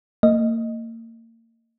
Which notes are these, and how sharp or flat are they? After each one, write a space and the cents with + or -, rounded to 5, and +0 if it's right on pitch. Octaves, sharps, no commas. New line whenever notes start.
A#3 -35 D#5 +0